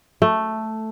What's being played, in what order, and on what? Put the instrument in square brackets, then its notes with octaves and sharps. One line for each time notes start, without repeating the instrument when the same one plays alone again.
[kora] A3